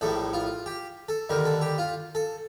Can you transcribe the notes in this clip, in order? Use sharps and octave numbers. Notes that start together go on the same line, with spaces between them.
A#1 A2 G3 A4
F4
G4
A4
D#2 D3 G3 A#4
A4
G4
F4
A4